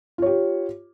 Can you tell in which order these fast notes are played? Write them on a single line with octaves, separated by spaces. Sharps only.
F4 C#5 G4